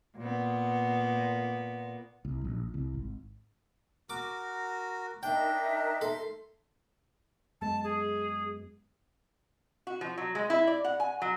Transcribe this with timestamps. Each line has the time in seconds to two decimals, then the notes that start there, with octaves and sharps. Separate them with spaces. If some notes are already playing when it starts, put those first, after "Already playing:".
0.18 A#2 B3
2.25 C2
2.44 A#1
2.74 C2
2.94 G#1
4.10 F#4 A#4 D6
5.23 D4 D#4 A#4 E5 G5
6.01 A4 C6
7.61 F#2 G#3 B3 A5
7.84 G#4
9.87 F#4
10.01 F3
10.17 F#3
10.35 G#3
10.50 E4
10.67 D5
10.85 F#5
11.00 G#5
11.22 F#3